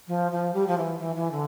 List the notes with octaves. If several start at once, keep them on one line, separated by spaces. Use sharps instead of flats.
F3
F3
G3
F3
E3
E3
E3
D3